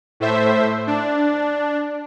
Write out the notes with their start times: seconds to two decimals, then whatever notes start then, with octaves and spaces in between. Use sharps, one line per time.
0.20 A2 A3 C5 E5
0.87 D4